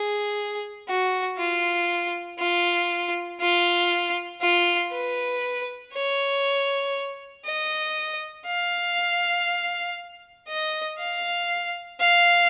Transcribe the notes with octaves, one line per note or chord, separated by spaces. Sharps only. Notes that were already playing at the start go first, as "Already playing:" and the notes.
Already playing: G#4
F#4
F4
F4
F4
F4
B4
C#5
D#5
F5
D#5
F5
F5